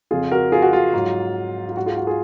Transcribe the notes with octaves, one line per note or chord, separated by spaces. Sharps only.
F2 C#3 F3 F4 G#4
F#4 A#4
F4 G#4
F#4
F4
G#2 F#3
F4
G#2 F#3 F#4
F4 G#4
F#4
F4 G#4